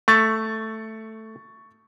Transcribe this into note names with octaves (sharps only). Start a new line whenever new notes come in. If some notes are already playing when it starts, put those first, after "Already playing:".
A3 C#6 A6